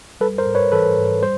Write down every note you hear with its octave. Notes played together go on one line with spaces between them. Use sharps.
G3 A4 B4
A#4 C5
G#2
B4 C#5
E3 A4 B4
G#2
G3 C5